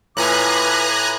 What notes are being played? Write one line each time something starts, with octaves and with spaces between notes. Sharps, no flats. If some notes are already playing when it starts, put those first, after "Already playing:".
A2 F4 B4 G#5 A#5 D6 F#6